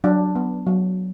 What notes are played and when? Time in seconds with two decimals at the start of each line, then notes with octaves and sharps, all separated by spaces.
0.04 F#3 D4
0.35 B3
0.67 F#3